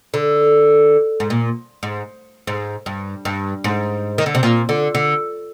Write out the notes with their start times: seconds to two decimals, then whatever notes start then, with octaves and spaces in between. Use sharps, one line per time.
0.14 D3
1.20 G#2
1.30 A#2
1.83 G#2
2.47 G#2
2.86 G2
3.25 G2
3.64 G#2
4.18 D#3
4.26 D3
4.35 C3
4.43 A#2
4.69 D3
4.95 D3